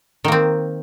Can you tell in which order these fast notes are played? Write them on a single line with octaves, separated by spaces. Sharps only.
D#3 A#3 C4